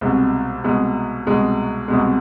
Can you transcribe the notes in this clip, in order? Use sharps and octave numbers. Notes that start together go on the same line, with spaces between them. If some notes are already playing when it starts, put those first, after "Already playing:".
C2 B2 G#3
C2 B2 G#3
C2 B2 G#3
C2 B2 G#3